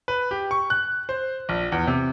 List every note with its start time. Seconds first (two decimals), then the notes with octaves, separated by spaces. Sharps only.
0.08 B4
0.31 G4
0.51 C#6
0.70 F#6
1.09 C5
1.49 A#1
1.72 E2
1.87 C3